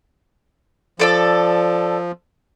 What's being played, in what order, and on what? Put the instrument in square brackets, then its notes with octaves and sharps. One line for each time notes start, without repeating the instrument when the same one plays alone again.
[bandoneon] F3 [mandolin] A4 D5 E6